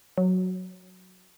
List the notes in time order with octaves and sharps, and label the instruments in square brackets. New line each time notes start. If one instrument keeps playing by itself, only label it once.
[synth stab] F#3